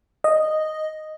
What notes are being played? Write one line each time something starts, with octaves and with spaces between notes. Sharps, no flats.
D#5